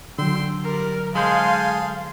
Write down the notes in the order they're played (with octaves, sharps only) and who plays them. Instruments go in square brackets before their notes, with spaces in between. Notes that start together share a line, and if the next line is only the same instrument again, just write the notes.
[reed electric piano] D3 F#3 [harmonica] G5 C6 E6
[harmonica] G3 [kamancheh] A#4
[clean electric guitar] G#3 C5 [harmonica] G#4 A4 C6 [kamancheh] F5